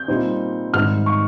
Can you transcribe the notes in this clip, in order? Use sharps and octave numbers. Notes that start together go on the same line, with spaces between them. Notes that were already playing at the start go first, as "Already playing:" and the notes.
Already playing: G6
A#2 G3 C4 D#4
G#2 D#3 G3 C4 D#4 F6
C#6